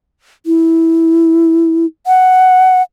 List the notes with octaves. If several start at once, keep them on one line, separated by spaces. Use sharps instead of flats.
E4
F#5